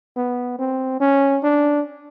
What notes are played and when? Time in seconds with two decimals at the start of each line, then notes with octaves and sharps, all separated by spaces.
0.17 B3
0.59 C4
1.00 C#4
1.43 D4